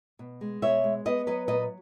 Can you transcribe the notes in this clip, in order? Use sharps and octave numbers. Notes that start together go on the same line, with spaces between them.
B2
G#3
B2 C#5 E5
G#3
B3 B4 D#5
F#3 B4 D#5
A#2 B4 D#5